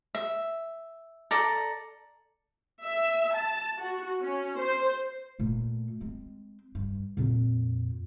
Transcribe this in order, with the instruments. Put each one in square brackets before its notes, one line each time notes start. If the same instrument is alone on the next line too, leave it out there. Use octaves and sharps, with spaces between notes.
[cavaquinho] E5
A4 D5 A#5
[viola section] E5
A5
F#4
C#4
C5
[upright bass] A#2 A3
G#3 C4
G2
F2 A#2